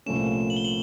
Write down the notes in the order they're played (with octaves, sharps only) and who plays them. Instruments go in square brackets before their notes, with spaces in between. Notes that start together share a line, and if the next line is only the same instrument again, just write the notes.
[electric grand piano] C2 A#2 F3 A3 C#4 [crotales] E7
[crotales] F#7
G7
F#7